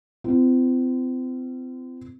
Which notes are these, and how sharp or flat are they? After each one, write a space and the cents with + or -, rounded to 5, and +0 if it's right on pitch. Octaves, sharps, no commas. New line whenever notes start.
C4 -35 F4 -40